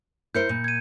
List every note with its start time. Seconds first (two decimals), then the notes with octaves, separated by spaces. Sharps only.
0.35 E4 A#4 C5 G6 C#7
0.49 A#2
0.64 G#6 D#7